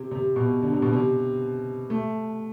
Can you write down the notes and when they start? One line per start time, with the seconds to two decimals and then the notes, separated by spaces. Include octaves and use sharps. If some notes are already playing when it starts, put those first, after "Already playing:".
Already playing: C3
0.11 C3
0.36 B2
0.63 D3
0.72 C3
0.82 B2
0.93 C3
1.90 A3